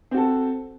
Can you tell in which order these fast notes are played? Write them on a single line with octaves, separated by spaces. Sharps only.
C4 F#4 A4